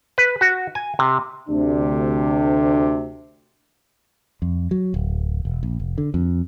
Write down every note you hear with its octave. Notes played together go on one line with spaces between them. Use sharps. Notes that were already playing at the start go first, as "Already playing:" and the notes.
B4
F#4
G#5
C3
D2 C3 D4
F2
F#3
D1
E1
A#1
F1
D3
F2